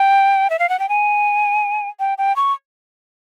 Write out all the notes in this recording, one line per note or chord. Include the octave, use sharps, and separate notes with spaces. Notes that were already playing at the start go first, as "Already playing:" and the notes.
Already playing: G5
E5
F5
F#5
G5
G#5
G5
G5
C#6